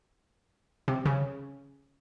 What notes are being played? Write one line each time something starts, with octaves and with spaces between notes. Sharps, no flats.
C3
C#3